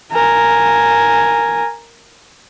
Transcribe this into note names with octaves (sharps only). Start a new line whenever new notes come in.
A#4 G#5